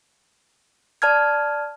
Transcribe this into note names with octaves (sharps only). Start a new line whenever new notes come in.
D5 A5 F6 G#6